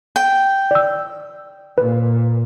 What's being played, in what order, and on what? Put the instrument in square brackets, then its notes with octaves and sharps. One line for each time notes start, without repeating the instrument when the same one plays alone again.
[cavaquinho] G5
[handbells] D5 E6
[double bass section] A#2 [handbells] B4